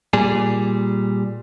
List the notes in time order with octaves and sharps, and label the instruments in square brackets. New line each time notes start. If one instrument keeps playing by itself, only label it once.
[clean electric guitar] A#2 G3 G#4